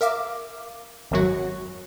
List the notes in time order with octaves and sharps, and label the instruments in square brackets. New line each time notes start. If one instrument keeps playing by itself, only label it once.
[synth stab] A#4 E5 F5 D6
G#1 F#2 F#3 F#4